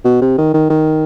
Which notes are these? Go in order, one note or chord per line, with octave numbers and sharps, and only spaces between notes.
B2
C3
D#3
D#3
D#3